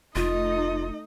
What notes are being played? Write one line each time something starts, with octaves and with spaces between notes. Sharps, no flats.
F1 A3 D#4 F4 D#5